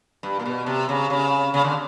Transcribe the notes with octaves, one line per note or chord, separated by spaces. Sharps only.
G2
A#2
B2
C3
C#3
C#3
C#3
D3